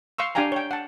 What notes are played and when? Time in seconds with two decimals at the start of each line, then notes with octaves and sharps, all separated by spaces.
0.18 F5 C6 C#6 E6
0.35 D4 G4 F5 G5 G#5 A#5
0.52 C#5 G5
0.71 F#5 A5